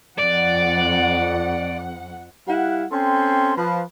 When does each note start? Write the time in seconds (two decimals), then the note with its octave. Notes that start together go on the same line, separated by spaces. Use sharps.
0.18 F2 D5 F#5
2.48 G3 E4 F5 F#5
2.91 C4 C#4 A4 G5 C6
3.56 F3 B4